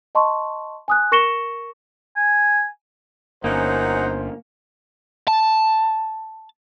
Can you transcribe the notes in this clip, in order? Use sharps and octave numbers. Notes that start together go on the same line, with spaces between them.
D#5 A5 C6 C#6
G#5 D#6 F#6
A#4 C#6 A#6 C#7 E7 G7
G#5
G1 F#2 A#3 C#4 D#4 C5 F#5
A5